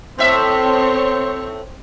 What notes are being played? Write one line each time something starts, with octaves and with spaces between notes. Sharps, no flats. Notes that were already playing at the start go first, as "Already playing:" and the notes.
A2 C4 C5 C#5 E5